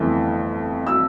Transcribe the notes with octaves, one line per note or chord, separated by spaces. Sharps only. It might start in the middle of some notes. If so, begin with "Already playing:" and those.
Already playing: G1 F2 E3 A3
E6